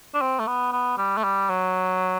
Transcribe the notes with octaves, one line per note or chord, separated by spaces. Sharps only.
D4
C4
A3
B3
B3
G3
A3
G3
F#3